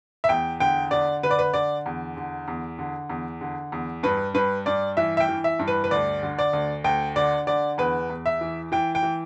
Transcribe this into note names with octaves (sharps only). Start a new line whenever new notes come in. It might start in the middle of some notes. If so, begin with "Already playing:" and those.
E5
E2 G5
D3 G5
D3 D5
D3 B4
D5
B4
D3 D5
E2
D3
E2
D3
E2
D3
E2
G2 B4
G2 B4
G2 D5
E3 E5
E5
G5
E3
E5
G2
B4
B4
D2 D5
D3
D5
D2
D2 G5
D3 D5
D3 D5
E2 B4
E2
E5
E3
E3 G5
G5
E3